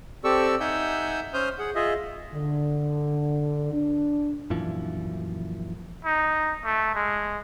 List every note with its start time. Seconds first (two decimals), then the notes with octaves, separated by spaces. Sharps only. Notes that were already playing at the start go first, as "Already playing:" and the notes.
0.24 C4 G4 A4 D5 C#6 E6
0.60 D#4 E5 F#5 G#5 E6 G6
1.34 C#4 C5 D#6 F6 G6
1.59 G#4 F#5
1.75 F4 G#4 D#5 E5
2.33 D3
3.71 D4
4.50 F#2 A#2 E3 F3
6.05 D#4
6.64 A3
6.95 G#3